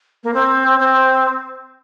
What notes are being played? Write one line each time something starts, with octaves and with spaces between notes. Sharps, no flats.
A#3
C4
C4